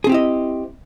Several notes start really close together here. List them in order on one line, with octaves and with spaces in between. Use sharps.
G#4 C4 G4 E4 D#5